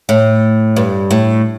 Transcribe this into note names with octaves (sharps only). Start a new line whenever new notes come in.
A2
G2
A2